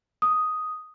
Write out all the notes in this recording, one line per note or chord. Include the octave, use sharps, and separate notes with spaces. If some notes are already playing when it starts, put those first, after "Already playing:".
D#6